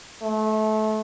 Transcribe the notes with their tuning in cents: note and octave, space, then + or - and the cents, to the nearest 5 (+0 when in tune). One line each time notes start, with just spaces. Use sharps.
A3 -25